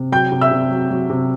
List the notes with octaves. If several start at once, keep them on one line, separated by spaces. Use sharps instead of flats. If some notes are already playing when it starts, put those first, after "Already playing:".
Already playing: C3
F#3 G5 G6
C3
E5 E6
C3
F#3
F#3
C3